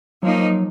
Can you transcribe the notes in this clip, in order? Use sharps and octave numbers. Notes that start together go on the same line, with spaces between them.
F3 F#3 A#3 D#4